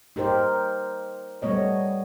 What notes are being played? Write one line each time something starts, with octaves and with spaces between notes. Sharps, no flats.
D#4 G4 A#4 C5
G3 A3 B3 C#5 D#5